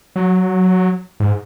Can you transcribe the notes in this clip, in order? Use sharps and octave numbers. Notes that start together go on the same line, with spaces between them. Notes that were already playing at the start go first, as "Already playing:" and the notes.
F#3
G#2